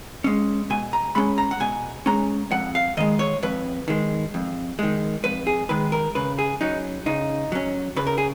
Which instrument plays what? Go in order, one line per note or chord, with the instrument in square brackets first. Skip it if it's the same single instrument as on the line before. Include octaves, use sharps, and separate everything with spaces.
[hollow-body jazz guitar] G#3 C#4
B2 G#5
A#5
G#3 C#4 B5
A#5
F#5
B2 G#5
G#3 C#4 A#5
F2 F#5
F5
D#3 G#3 D#5
C#5
F2 B4
D#3 G#3
F2
D#3 G#3
F2 B4
G#4
D#3 G#3 B4
A#4
C#3 B4
G#4
F#3 C#4 D#4
C#3 D#4
F#3 C#4
C#3 B4
A#4
G#4